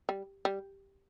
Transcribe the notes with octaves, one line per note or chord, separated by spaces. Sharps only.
G3
G3